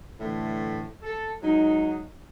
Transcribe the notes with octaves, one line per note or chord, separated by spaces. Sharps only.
A2 D3 E3 A3
A4
F#3 G#3 D#4